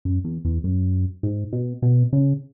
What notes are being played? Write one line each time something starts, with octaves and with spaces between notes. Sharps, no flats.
F#2
E2
E2
F#2
G#2
B2
B2
C#3